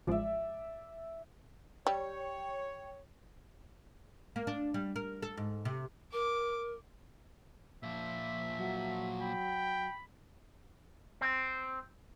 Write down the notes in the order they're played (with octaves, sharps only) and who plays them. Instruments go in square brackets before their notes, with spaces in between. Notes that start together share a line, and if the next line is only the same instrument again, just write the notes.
[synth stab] A1 F3 G#3 [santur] D5 E5
[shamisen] G3 [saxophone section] C#5 [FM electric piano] G5
[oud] A#3
D4
G3
A#4
A4
G#2
C3
[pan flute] A#4 [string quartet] D6
[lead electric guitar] A#2 F3 [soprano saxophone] E5
[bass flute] F#3
[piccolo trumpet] G5 [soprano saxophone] B5
[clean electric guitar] C4